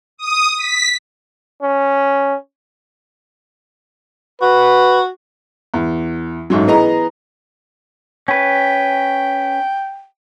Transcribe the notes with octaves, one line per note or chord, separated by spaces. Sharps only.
D#6
B6
C#4
F#4 B4
E2
A1 G#2 F#3
E3 B3 G#4 D#5 A#5
C#4 B4 G5